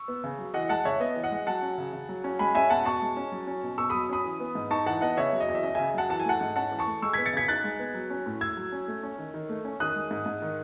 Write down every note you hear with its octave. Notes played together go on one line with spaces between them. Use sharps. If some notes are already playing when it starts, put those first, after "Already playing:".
Already playing: C#6 E6
B3
C#3
F#3
E3 D#5 F#5
G#3 F#5 A5
C#3 C#5 E5
B3 D#5
E3
D#5 F#5
G#3
F#3 F#5 A5
C#4
C#3
C#3
F#3
C#4
G#3 G#5 B5
C#4 E5 G#5
B2 F#5 A5
B2 A5 C#6
G#3
C#4
F#3
C#4
B2
B2 C#6 E6
F#3 B5 D#6
C#4 B5 D#6
E3
B3
G#2
D#4 A5 C#6
E3 F#5 A5
B3 D#5 F#5
C#3 C#5 E5
F#3
D#5
E2
E5
C#4 D#5
C#3 E5 G#5
F#3 F#5 A5
E3 A5
G#5
A3 F#5 A5
G#2
C#4 F#5 A5
E3
A5 C#6
A3
G#3 C#6 E6
B3 G#6 B6
A6 C#7
C#3 G#6 B6
D#4 F#6 A6
G#3
B3
F#3
C#4
A2
A2 E6 G#6
F#3
C#4
A3
C#4
D#3
D#3
A3
C#4
D#3 D#6 F#6
G#3
G#2
G#2
D#3